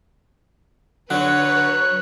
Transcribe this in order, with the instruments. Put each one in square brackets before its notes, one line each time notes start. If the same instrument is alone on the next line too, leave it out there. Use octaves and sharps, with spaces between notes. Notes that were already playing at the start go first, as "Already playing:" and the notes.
[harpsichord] D3 [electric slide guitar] F#3 [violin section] B4 C#5 [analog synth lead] F#6